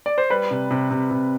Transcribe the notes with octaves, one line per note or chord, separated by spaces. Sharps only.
D5
C5
G3 B4
C3
C3
C3
C3